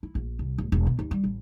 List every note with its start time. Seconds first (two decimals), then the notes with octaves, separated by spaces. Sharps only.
0.03 E4
0.15 A#1
0.39 C2
0.58 D1
0.72 E1
0.86 B2
0.99 D#2
1.11 G3
1.24 A1